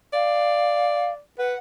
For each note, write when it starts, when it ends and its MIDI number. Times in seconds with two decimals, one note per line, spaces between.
0.14 1.20 74
0.14 1.12 77
1.39 1.55 71
1.39 1.58 78